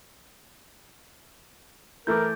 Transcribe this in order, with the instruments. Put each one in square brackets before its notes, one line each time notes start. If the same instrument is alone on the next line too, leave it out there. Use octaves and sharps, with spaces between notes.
[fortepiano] E3 A3 E4 [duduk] A#4 [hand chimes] D6 G6